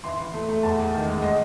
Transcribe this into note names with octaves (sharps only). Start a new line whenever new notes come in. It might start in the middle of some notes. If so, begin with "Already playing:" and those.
E3 C6
E3
A3
A3
E2 A5
E2
D#3
G#3
G#3 D#5